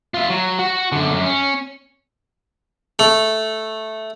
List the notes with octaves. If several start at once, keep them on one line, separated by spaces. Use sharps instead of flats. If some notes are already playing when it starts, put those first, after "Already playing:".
F4 E5
F#3
F#4
F#2 D3
F#2
C#4
A3